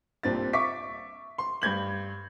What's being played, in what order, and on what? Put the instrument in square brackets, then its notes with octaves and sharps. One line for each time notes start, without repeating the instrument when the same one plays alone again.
[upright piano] C2 A#2 C4 D4 A6
E5 C#6 D6 B6
C6
G2 G6 G#6 F#7